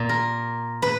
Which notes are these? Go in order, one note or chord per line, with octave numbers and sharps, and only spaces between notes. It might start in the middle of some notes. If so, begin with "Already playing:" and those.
Already playing: A#2
A#4
B4